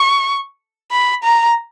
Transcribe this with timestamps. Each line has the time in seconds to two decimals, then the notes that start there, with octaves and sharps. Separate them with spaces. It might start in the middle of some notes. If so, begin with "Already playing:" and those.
Already playing: C#6
0.91 B5
1.23 A#5